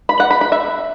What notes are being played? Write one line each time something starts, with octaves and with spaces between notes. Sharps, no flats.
B5
F#5
B5
B5
E5